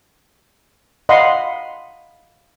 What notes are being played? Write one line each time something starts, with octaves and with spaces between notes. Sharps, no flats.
D#5 F5 F#5 B5 C6